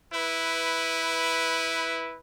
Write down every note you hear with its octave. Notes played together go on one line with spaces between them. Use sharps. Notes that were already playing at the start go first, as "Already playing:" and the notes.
E4 B4